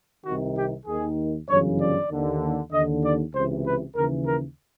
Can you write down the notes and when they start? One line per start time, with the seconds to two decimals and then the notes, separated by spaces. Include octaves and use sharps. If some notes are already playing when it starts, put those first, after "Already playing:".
0.24 C2 C3 D#3 F#4
0.56 G4
0.86 D#2 D#3 G#4
1.48 G1 F#2 C#3 E3 C#5
1.79 D5
2.09 D#2 D3
2.71 D#2 D3 D#5
3.03 D5
3.34 C#2 C3 E3 C5
3.65 B4
3.95 D#2 C#3 E3 A#4
4.27 A#4